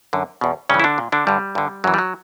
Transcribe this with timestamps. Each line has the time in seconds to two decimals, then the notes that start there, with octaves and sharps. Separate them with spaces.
0.13 F#2 D3
0.41 E2 B2
0.69 G2 C#3 E3 C#4
0.80 E4
0.84 D3 D4
0.98 A#2
1.12 D3 D4
1.27 G2 D3 G3
1.55 G2 D3
1.84 F#2 E3 F#3
1.94 G3
1.98 F#3